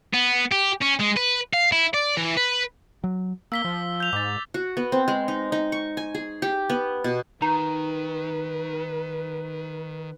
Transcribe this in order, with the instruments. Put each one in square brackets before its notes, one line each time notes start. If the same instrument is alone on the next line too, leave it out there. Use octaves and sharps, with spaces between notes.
[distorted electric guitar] B3
G4
C#4
G#3
B4
F5
E4
D5
E3
B4
[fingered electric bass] F#3
[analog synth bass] A#3 [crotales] E6 B6 G7
[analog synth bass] F3
[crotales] G6 F7
[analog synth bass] G#2 [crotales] D6 A6
[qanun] F#4
B3
C4
G#3
D#4
D#4
C#6
G#5
G#4
G4
B3
B2
[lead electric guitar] D#3 [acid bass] D#4 [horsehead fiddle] B4 [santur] A#5